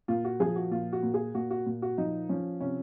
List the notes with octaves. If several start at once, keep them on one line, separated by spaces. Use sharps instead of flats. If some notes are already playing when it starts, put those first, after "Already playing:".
A#2 F4
F#4
F3 G#4
F#4
A#2 F4
F#4
A#2
G#4
A#2 F#4
F#4
A#2
F#4
F3 D#4
F3 C#4
C3 C#4